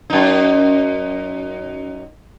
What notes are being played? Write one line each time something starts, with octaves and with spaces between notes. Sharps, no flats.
F#2 D#4